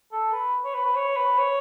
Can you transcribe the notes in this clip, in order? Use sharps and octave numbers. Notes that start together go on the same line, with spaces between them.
A4
B4
C#5
B4
B4
C#5
B4
C#5